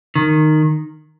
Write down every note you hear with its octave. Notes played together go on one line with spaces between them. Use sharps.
D#3